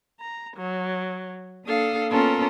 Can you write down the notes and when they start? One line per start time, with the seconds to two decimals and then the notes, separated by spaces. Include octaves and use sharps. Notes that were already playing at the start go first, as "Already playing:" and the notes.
0.20 A#5
0.55 F#3
1.66 A#3 D4 A4 F5 D#6
2.11 A#3 B3 C#4 F4 A4 A#4